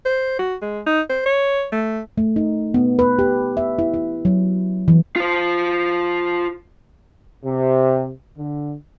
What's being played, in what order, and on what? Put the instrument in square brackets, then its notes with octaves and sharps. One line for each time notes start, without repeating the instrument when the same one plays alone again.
[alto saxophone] C5
F#4
G#3
D#4
C5
C#5
A3
[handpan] A3
D#4
B3
B4
G4
E5
E4
E4
F#3
E3
[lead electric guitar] F4 C5
[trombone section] C3
D3